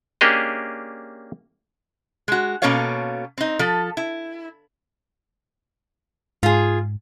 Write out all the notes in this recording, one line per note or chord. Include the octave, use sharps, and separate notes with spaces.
A#3 C#4 D4 G4 G#4 D#5
G#3 F#4
B2 A#3 C#4 A4 C#5 F5
C4 D#4
F3 A4
E4
G#2 F4 G#4